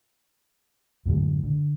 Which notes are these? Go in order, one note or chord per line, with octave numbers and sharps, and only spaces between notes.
F#2 A2 D3 G#3
D3